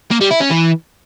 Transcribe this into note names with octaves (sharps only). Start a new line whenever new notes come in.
A#3
G3
E4
C#4
E3